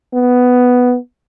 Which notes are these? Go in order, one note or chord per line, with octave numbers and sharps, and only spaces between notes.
B3